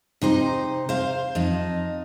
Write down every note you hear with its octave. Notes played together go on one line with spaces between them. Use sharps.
C3 D#4 C5
C5 F5
F2 D#4